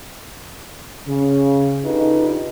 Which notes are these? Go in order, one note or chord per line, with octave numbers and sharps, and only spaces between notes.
C#3
D4 D#4 F4 G4 A4 B4